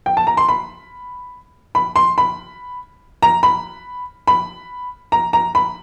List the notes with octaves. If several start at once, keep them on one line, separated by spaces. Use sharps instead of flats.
G5
A5
A#5
C6
B5
B5
C6
B5
A#5
B5
B5
A#5
A#5
B5